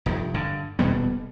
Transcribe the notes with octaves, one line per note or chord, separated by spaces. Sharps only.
F1 G2
G2 D3
D#1 B2 G3 B3